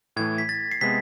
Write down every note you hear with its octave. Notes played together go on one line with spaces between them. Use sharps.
A2 E3 A3 G#6
B6
A6
C7
C3 G#3 B3 B6